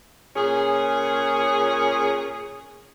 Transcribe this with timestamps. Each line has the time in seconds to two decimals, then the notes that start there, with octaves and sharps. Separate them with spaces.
0.36 A#2 C#4 G#4